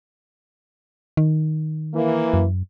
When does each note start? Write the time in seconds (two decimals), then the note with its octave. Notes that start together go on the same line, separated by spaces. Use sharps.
1.17 D#3
1.93 E3 A#3
2.34 F#2